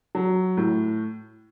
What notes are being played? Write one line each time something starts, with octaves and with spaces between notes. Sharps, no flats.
F#3
A2